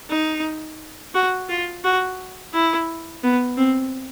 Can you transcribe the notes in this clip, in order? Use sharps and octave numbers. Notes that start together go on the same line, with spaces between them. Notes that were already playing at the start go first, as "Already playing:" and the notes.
D#4
F#4
F4
F#4
E4
B3
C4